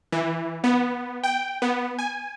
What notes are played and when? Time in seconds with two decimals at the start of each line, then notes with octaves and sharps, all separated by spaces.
0.12 E3
0.64 B3
1.24 G5
1.62 B3
1.99 G#5